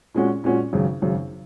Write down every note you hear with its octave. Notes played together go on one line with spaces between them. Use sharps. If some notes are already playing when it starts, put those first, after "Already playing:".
A#2 G#3 C#4 F#4
A#2 G#3 C#4 F#4
G#1 F#2 C#3
G#1 F#2 C#3